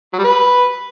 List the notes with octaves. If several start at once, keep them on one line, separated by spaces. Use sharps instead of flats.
F#3
G3
B4